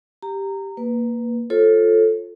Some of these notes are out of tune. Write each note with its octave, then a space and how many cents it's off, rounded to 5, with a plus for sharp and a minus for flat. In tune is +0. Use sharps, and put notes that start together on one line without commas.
G4 +0 A#5 -15
A#3 +0 B4 -5
F4 +10 A4 +0 C#5 -45